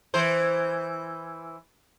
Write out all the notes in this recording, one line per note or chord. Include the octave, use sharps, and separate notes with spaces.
E3 C5